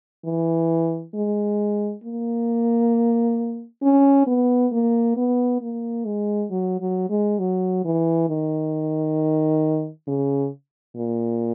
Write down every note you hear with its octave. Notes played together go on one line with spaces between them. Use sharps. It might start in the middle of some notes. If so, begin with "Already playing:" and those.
E3
G#3
A#3
C#4
B3
A#3
B3
A#3
G#3
F#3
F#3
G#3
F#3
E3
D#3
C#3
A#2